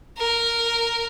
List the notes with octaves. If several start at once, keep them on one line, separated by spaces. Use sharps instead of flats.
A#4